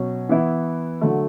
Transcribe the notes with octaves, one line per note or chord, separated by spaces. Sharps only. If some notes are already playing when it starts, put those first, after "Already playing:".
Already playing: B2 F#3 C#4
E3 B3 E4
D3 F#3 A3